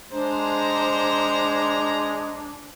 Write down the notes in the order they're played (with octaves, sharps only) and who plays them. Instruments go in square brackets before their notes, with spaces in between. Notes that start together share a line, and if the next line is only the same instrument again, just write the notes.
[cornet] G#3 [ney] D4 [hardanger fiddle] C5 [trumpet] A#5